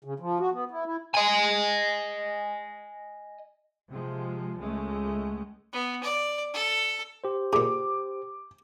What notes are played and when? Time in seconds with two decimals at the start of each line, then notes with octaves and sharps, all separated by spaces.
0.04 C#3
0.20 F3
0.39 F#4
0.52 B3
0.71 E4
0.86 E4
1.14 D#5 G#5
3.88 C3 F3 G#3
4.58 C#2 G#3 A3
5.73 B3
6.03 D5
6.54 A4
7.24 G4 C5
7.53 A#2 G#4 D6